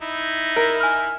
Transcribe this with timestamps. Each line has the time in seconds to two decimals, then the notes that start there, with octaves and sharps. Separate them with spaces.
0.02 D#4 E4
0.56 A#4
0.81 G#5 F6